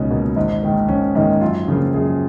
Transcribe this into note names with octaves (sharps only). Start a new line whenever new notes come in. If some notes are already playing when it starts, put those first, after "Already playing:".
Already playing: C#2 B2 A#3 C#4 D#4
B2 A#3
G#1 D#4
G#2 D#3 A#3
G#1 C#4
G#2 D#3 A#3 D#4
F#2 F4
C#3 F3 A#3
F#2 G#4